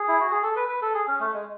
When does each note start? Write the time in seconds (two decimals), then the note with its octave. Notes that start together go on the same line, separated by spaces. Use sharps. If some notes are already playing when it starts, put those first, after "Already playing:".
Already playing: G#4
0.08 E4
0.20 F#4
0.31 G#4
0.43 A4
0.56 B4
0.69 B4
0.82 A4
0.94 G#4
1.08 C#4
1.20 A3
1.33 G#3